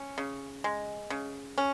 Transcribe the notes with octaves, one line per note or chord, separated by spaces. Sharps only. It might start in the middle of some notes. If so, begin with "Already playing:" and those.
Already playing: C#4
C#3
G#3
C#3
C#4